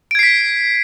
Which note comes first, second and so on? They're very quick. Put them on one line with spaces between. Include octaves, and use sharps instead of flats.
D7 G#6 C7 B6